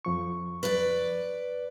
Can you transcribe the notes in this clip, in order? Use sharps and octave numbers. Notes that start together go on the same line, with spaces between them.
F2 F3 C#6
B4 D5